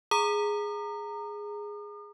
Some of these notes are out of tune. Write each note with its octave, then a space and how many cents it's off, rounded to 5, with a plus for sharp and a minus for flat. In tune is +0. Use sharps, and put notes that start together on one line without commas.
G#4 +0 A#5 -15 D#6 -45